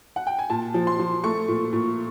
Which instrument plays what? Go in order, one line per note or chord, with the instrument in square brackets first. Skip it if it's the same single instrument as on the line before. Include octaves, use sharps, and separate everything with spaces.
[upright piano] F#5
G5
G#5
A#2 A5
F3
C6
F3
A3 C#6
A#2
A#2